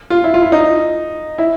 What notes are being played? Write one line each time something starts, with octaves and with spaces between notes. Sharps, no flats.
F4
E4
F4
E4
D#4
E4